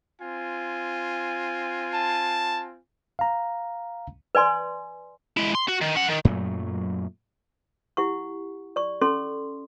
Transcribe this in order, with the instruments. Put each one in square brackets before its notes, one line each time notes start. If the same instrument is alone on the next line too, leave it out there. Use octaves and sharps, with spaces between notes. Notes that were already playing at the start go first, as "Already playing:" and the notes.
[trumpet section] C4 F4 G#5
[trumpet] A5
[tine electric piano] F5 A#5
[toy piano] B4 D5 G#5 C6
[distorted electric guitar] G#3 E4
C6
F#4
D#3
C#4 F#5
D#3
[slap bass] F#2 A#2 F#3 A3
[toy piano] E4 G4 F#5 C#6
D5 C#6
C#4 A4 C6